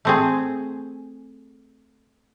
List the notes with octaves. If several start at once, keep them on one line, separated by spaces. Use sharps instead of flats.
A3 C4 G#4